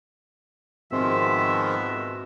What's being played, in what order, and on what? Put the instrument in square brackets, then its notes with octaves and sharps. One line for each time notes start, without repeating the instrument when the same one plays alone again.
[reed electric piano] G#2 C4 C6 [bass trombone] B2 [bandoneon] D#3 F3 G#3 [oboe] E5